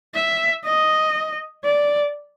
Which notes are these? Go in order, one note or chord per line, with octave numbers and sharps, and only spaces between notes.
E5
D#5
D5